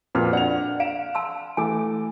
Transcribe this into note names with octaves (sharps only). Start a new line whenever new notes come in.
F2 A#2 C4 F#4 B4 F6
D4 D5 F#5 F7
F5 D7 E7
A5 C6 E6
E3 A3 G#5 D6